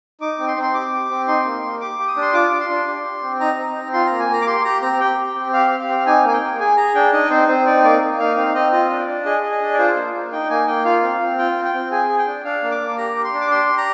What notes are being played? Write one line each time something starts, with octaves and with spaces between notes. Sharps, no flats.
D#4 D6
C4
C6
C4
C6
G4 D6
G4
C4
D#4 C6
A#3
A#3
G4 D6
G4
D#6
D4
C6
F4 D6
D4
C6
D4
G4
G4
C4
D#4 A#5
C4
C4
F4 C6
A#3 A#5
G#5
A#3 A#5
D6
G4 C6
G4 A#5
C4 A#5
G4 G5
G4
C4
G4 F5
G4
F5
C4
D#4 G#5
A#3 G#5
G5
A#3
G#4 G#5
G#4 A#5
D4 G5
D#4 D#5
C4 C5
C4 C5
D#4 D5
A#3 D5
A#3
D#4 F5
C4 F5
C4 D#5
F4 D#5
D4
D5
D4
G#4 D#5
G#4
D#5
D4
D5
F4 C5
A#3
A#3
D#4 G5
A#3 G#5
A#3 G5
F4 F5
C4
C4
F4 G5
C4
G5
C4
G#4 G#5
G#4
G5
D4
D4 F5
A#3
D6
A#3
G4 A#5
G4
C6
D4
D6
G4 C6
G4
A#5